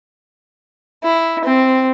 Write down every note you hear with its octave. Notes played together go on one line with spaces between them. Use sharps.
E4
C4